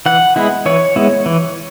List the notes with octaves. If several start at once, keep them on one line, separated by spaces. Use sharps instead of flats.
E3 F#5
G#3 B3 E4
E3 C#5
G#3 B3 E4
E3